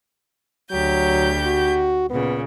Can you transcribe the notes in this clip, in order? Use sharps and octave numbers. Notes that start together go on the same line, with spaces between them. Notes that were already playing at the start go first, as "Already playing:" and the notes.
D2 F#3 G4 G6
F#4
A#2 C#3 B3